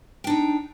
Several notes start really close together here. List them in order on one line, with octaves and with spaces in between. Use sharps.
G5 D4 D#4